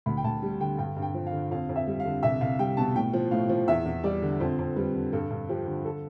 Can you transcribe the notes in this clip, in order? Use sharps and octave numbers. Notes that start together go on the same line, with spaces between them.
D2 B5
G5
D2 A5
G3
D3 G5
G2 G5
G2
G5
F3
F5
D3
F2 F5
F2
E5
G3
F5
D3
C2 E5
C2 F5
G3 G5
B2 A5
A2 G5
F3
A2 F5
F3
E2 E5
E2
G3 D5
D3
F2 C5
F2
G3 B4
D3
G2 A4
G2
F3 G4
D3
A4